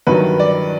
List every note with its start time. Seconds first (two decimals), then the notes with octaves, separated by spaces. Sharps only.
0.07 G2 D#3 F#3 B4
0.39 D5